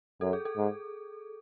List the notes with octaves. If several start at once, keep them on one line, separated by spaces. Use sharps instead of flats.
F#2 A4
G#4
A4
G#2